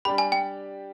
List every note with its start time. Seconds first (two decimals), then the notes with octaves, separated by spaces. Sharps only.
0.05 G3 D4 G4 B5
0.18 G#5
0.32 G5